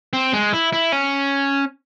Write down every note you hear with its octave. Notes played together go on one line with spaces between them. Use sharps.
C4
G#3
E4
E4
C#4